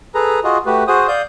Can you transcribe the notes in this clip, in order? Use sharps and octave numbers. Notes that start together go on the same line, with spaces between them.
G#4 A4 B4 A#5
F4 F#4 G#4 D#5
A3 F#4 G4 B4
F#4 G#4 C5 D#6
D5 F5 D#6 G6